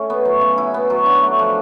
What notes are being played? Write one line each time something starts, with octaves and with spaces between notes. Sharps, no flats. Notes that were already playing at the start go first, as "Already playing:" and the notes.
Already playing: A3 C#4
B3
F#3
C#3
E4
B3
F#3
D4
A3
F3